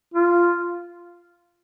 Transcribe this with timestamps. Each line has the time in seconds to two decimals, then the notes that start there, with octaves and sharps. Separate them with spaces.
0.14 F4